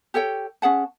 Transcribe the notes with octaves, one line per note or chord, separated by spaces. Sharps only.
G4 A4 C#5 G5
C#4 G#4 F#5 A5